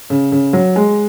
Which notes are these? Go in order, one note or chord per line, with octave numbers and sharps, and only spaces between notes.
C#3
C#3
F#3
G#3